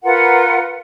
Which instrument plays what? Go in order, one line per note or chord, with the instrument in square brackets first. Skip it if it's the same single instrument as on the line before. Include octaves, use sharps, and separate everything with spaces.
[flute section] F4 A#4 B4 F#5